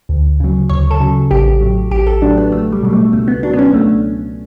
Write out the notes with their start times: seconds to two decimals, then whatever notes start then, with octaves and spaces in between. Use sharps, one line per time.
0.09 D2
0.40 C#3 F#3
0.69 D2 C#5
0.91 A4
1.00 C#3 F#3
1.31 A1 G4
1.61 A2 F#3
1.91 A1 G4
2.07 A4
2.22 A2 F#3 D4
2.37 B3
2.52 C#2 A3
2.72 G3
2.83 B2 F#3 G3
2.93 A3
3.13 C#2 A3
3.28 B3
3.43 B2 F#3 D4
3.54 B3
3.59 C#4
3.74 C#2 A3